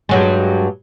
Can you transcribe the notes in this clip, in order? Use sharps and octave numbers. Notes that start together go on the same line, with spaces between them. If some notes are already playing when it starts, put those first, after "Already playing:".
G2 F#3 G#3